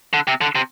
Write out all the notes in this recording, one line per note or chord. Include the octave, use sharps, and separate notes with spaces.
D3
C3
D3
C3